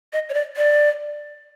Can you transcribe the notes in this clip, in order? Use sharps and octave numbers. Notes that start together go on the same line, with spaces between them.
D#5
C#5
D5
D5